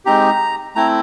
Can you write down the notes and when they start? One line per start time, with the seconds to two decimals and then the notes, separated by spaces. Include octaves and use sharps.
0.05 G#3 C4 D#4 G4 A#5
0.75 A3 C4 E4 A#5